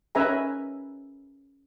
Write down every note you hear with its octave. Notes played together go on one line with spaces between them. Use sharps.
C#4 A#4 B4 E5 G#5 A#5